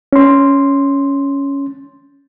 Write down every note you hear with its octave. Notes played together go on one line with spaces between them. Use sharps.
C#4 C6